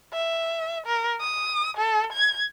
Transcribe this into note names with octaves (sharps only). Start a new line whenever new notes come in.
E5
A#4
D#6
A4
G#6